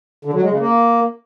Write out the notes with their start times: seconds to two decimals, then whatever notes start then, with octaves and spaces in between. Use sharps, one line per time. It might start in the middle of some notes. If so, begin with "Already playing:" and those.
0.25 D3
0.34 F#3
0.42 G#3
0.51 C#3
0.59 A#3